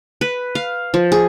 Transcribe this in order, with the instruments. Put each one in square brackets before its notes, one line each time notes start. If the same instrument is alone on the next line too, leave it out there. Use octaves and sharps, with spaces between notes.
[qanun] B4
F5
F3
G#4